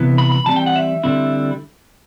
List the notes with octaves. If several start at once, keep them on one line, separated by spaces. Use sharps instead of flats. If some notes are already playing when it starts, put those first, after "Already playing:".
Already playing: C3 E3 B3 E4
B5
B5
E3 G3 C4 A5
G5
F#5
E5
D3 G3 C4 E4